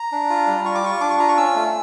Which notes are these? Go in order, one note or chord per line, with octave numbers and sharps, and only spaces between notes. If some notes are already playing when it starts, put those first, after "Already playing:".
Already playing: A#5
D4
F4
G3
F4 C#6
D6
F4 C#6
D4 D6
C#6
F4 A#5
C#6
C#4 E6
A3